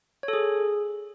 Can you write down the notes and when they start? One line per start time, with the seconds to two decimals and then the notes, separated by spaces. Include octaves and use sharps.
0.23 C#5
0.28 A4
0.33 G#4